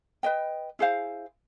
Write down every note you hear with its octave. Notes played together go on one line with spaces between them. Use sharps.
B4 D#5 G5
E4 G#4 C5 F5